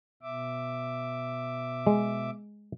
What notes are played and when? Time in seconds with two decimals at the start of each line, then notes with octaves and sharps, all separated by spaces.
0.23 B2 E5 D6
1.87 G#3